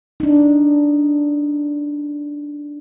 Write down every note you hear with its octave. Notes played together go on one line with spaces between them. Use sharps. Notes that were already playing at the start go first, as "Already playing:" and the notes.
D4 D#4